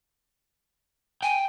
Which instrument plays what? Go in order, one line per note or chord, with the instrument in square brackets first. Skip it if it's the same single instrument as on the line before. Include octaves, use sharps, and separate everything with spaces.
[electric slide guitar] G5 [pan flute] G#5